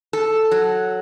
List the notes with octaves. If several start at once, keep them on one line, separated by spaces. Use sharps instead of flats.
A4
F#3